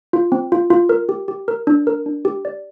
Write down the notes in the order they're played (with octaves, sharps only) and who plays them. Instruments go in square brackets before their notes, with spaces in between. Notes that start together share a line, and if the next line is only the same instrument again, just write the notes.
[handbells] F4
C4
F4
F4
A#4
G4
G4
A#4
D4
A#4
D4
G4
D5